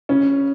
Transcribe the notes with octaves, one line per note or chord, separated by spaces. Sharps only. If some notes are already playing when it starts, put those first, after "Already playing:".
C#3 C#4